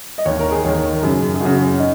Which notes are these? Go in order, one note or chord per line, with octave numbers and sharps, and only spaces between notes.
D#5
D#2 D#3 C#5
A#4
G#4
D#2 D#3 C#5
A#4
F#2 C#3 G#4
G#4
F#2 C#3 F#4
C#4
D#4